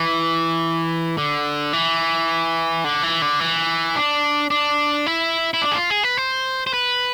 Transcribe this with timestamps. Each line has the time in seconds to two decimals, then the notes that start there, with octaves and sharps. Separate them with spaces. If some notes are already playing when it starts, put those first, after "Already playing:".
Already playing: E3
1.18 D3
1.73 E3
2.84 D3
3.03 E3
3.22 D3
3.40 E3
3.96 D4
4.50 D4
5.06 E4
5.54 E4
5.62 D4
5.72 G#4
5.75 F4
5.90 G#4
6.04 B4
6.17 C5
6.67 C5
6.74 B4